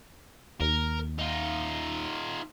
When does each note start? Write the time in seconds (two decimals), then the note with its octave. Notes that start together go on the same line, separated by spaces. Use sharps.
0.61 D#2 A#4
1.19 D#4 F4